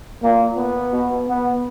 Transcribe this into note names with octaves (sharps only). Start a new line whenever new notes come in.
A#2 A#3
B3
B2
B3